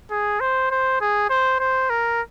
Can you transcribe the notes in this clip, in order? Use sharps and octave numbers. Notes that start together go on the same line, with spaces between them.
G#4
C5
C5
G#4
C5
C5
A#4